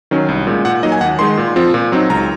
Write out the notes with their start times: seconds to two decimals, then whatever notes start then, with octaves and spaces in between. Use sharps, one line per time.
0.11 D#3 F#3 C#4
0.29 C2
0.47 A#2 G#3
0.65 A#2 F#5
0.83 F#3 A#3 D#4 D#5
0.92 G#5
1.01 D#2 F#5
1.19 D#3 G#3 D#4 C6
1.37 A#2
1.56 F3 C4 F4
1.74 A#2
1.92 F#3 C4 D#4
2.10 C#2 A#5